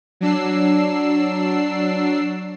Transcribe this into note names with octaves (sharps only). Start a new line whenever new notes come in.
F#3 D4 E6 C7